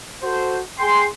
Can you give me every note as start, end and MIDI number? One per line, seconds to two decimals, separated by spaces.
0.21 0.58 66
0.21 0.58 69
0.21 0.58 72
0.79 1.04 68
0.79 1.04 79
0.79 1.04 84